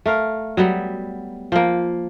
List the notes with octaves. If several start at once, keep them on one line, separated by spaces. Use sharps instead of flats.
A3 A#4 F5
F#3 G3 B3
F3 A#3